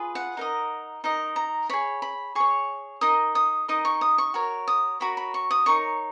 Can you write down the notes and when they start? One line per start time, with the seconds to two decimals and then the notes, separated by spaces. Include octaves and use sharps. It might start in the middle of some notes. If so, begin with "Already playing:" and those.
Already playing: F4 G#4 B4
0.15 F#5
0.37 D#4 A#4 D#5
1.04 D#4 A#4 D#5
1.36 A#5
1.69 G#4 C#5 B5
2.02 B5
2.35 G#4 C#5 C#6
3.01 D#4 A#4 D#5 D#6
3.35 D#6
3.68 D#4 A#4 D#5 D#6
3.85 C#6
4.01 D#6
4.18 C#6
4.34 F#4 A#4 C#5
4.68 D#6
5.00 F#4 A#4 C#5 B5
5.17 B5
5.34 C#6
5.51 D#6
5.66 D#4 A#4 C#5 C#6